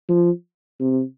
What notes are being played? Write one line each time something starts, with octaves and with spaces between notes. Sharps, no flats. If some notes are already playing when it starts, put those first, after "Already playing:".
F3
C3